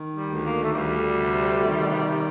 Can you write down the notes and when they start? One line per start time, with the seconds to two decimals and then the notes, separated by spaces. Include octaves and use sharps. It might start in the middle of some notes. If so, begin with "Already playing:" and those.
Already playing: D#3
0.14 G3
0.28 D2
0.44 A#3
0.62 A3
0.74 D2 G3
1.21 C3
1.65 D#3